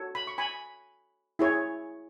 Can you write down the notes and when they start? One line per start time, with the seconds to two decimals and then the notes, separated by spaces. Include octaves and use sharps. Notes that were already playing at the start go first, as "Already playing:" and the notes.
Already playing: F#4 A4 C#5
0.15 B5
0.27 C#6
0.38 G#5 B5
1.39 E4 G#4 C#5